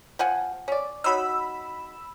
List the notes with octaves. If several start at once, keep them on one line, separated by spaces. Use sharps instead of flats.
F3 F#5 G#5
C#4 D5
F#3 D#4 B5 E6